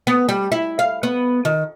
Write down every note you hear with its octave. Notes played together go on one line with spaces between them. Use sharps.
B3
G3
E4
F5
B3
D#3